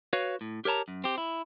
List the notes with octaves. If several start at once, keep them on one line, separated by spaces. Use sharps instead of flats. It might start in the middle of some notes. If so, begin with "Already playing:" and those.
F#4 B4 C#5 F5
A2
G4 A#4 C#5 A5 A#5
F#2
C4 G4
E4